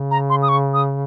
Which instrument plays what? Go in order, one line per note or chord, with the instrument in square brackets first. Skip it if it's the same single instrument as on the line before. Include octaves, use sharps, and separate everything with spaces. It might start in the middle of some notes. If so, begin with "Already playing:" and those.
Already playing: [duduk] C#3
[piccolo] A#5
C6
D#6
C#6
D#6